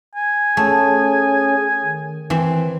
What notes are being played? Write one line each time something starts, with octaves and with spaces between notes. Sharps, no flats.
G#5
A3 C#4 G#4 C#5
D#3
E3 C4